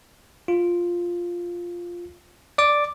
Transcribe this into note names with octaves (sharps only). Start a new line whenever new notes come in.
F4
D5 D6